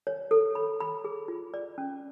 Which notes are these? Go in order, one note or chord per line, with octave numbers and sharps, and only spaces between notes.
C#5
A4
B5
B5
G#4
F4
D5
C#4